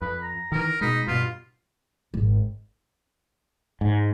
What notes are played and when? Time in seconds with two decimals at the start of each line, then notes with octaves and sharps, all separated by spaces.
0.02 F2 B4
0.23 A#5
0.52 D#3 E3 A#4
0.81 B2 G#3 D#4 B5
1.07 G2 B2 F4
2.14 G#1
3.81 G#2